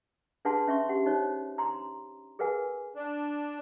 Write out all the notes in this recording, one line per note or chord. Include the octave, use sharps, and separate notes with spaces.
D4 G#4 B4 F#5 A5 C6
C#4 E5 C6 C#6
G4 F#5
D#4 C5 C#5
A#5 C6
G#4 A#4 B4 F#5 G#5
D4